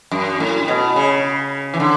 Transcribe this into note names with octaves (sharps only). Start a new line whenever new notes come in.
F#2
A2
B2
C#3
E3
D3